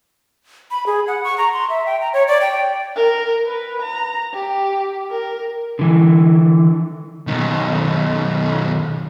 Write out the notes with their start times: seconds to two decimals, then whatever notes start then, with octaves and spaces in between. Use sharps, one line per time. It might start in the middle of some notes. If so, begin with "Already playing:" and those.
0.71 B5
0.86 G#4
1.07 F#5
1.24 C#6
1.38 A#5
1.53 C6
1.70 E5
1.86 G5
2.01 A#5
2.13 C#5
2.28 D5
2.41 G5
2.96 A#4
3.46 B4
3.82 A#5
4.34 G4
5.10 A#4
5.79 D3 E3
7.27 B1 D#3